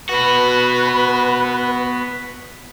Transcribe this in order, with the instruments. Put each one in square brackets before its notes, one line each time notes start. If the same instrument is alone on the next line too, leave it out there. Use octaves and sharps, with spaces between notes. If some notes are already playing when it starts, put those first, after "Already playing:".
[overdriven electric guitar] B3 F#4 [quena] B4